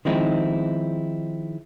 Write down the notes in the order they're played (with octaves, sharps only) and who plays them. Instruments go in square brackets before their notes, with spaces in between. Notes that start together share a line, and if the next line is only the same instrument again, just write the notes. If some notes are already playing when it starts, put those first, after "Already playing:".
[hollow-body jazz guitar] D#3 F3 G#3 C4 D#4 E4